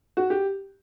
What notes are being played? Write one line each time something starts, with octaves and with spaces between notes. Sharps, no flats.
F#4
G4